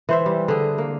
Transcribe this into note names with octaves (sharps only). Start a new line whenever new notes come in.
E3 C5 E5
G3
D3 G#4
A#3